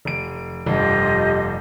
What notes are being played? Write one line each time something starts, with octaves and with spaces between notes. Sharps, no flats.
F1 D7
F1 G2 F4 G4 D#5